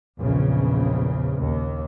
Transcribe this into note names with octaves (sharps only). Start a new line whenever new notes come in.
A#1 E2 C#3
D#2